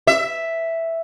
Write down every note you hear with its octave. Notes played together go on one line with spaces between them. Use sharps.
E5